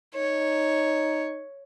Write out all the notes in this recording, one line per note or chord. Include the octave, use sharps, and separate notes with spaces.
D#4 C#5